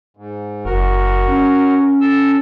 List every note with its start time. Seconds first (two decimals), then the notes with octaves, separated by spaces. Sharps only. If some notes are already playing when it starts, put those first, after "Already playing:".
0.17 G#2
0.65 F#1 F#4 A#4
1.28 C#4
2.01 A4 E6